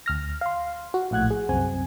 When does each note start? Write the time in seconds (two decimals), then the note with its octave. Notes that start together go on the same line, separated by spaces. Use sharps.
0.06 D2 F6 A#6
0.41 F5 C6
0.94 F#4
1.11 A#1 A2 F#5 F#6 G#6
1.30 G#4
1.49 C2 F#2 C4 G#5